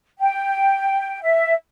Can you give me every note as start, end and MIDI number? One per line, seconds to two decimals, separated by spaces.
0.20 1.19 79
1.23 1.53 76